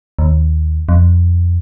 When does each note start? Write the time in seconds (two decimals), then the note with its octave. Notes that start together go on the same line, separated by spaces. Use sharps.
0.19 D#2
0.89 F2